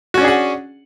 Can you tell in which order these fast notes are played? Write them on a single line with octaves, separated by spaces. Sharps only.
F#4 C#4 D4 G#4 F#5